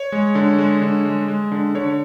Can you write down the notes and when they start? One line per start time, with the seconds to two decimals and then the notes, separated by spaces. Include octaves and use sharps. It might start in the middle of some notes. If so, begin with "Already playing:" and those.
Already playing: C#5
0.12 G#3
0.35 D3
0.58 G#3
0.82 D3
1.05 G#3
1.28 G#3
1.52 D3
1.75 D3 C#5